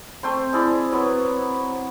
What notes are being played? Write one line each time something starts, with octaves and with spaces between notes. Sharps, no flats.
A3 C4 C5 G5 C6
G#3 E4 D5
F#3 B3